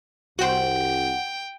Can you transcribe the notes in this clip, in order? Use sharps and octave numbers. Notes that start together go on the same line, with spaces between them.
C2 F#4 C5 F#5 G5